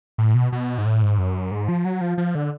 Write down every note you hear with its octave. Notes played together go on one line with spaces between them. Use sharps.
A2
B2
B2
G#2
A2
G#2
F#2
G#2
F3
F#3
F3
F3
D3